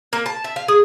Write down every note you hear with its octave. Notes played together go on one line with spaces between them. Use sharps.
A#3
A5
E5
F5
G#4